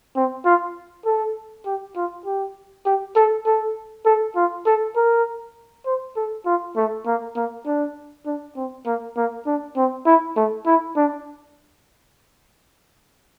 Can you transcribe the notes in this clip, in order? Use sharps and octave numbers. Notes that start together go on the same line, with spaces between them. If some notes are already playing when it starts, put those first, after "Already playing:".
C4
F4
A4
G4
F4
G4
G4
A4
A4
A4
F4
A4
A#4
C5
A4
F4
A3
A#3
A#3
D4
D4
C4
A#3
A#3
D4
C4
E4
A3
E4
D4